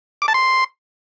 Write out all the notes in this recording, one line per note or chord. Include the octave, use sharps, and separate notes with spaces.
D6
A5
C6